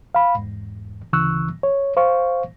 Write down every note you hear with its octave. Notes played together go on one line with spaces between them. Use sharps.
F5 B5
E2 G#2
D2 C#3 E3 C#6 E6 F#6
C#5
C5 F5 C#6